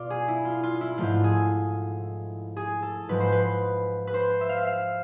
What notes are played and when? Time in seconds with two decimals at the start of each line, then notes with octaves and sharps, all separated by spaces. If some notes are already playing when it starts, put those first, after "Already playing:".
Already playing: B2 F4 D5
0.10 G#4
0.28 E4
0.45 F4
0.63 F4
0.81 E4
0.98 G#2 F3 A3 F4
1.24 G#4
2.57 G#4
2.82 A4
3.09 G#2 F3 G#3 B4
3.20 C5
3.32 B4
4.07 B4
4.14 C5
4.41 E5
4.49 F5
4.57 E5
4.67 F5